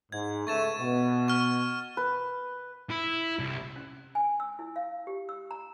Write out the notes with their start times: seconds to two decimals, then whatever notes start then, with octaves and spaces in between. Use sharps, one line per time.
0.12 G#2 G#6
0.47 C#2 A3 C#6 A6 E7
0.79 B2
1.28 C#6 F6
1.97 B4
2.90 E4
3.39 C2
3.76 C#4
4.15 G#5
4.40 E6
4.59 E4
4.76 F5
5.07 G4
5.29 E6
5.51 A#5